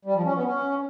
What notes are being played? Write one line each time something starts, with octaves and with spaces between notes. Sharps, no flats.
G3
F3
C#4
B3
C#4